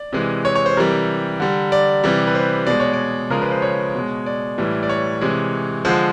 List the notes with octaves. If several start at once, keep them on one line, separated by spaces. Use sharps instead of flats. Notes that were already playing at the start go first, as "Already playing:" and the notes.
Already playing: D5
C3 E3 G#3
C#5
C#5
C5
C3 E3 G3 A#4
D3 G3
D5
C3 E3 G3
B4
C5
B2 G#3 D5
C#5
D5
C#3 F3 G#3 A#4
B4
C5
C#5
B2 G#3
D5
A2 E3 G3
D5
C#5
C3 E3 G#3
D3 F3 G#3 C5